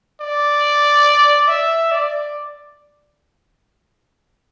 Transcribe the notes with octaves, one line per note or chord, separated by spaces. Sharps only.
D5
E5
D5